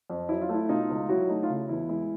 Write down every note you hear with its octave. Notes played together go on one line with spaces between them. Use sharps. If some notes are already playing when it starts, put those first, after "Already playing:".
F2
F#3 E4
F4
A3 E4
B2 D#4 F4
C#2
F#3 E4 F#4
A3 D#4
F4
C#3 E4
E2 E4
G#3 E4